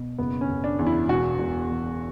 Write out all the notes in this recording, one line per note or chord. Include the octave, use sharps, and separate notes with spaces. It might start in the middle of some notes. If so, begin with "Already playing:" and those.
Already playing: B2
F#1 B3
C#4
F#1
D4
E2
E4
E1 F#4
E1
E2